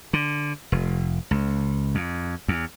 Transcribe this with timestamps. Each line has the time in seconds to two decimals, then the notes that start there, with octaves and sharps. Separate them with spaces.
0.13 D3
0.72 F1
1.31 C#2
1.95 F2
2.48 E2